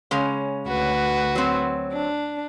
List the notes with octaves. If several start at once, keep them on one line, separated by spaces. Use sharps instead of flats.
C#3 G#3 C#4
D2 F#4 B4
F#3 C4
D4